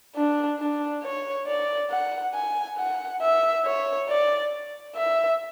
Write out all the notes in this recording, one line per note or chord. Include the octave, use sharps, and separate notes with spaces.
D4
D4
C#5
D5
F#5
G#5
F#5
E5
C#5
D5
E5